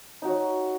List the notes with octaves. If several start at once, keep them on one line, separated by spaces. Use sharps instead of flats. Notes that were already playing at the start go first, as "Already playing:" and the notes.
F#3 D#4 F#4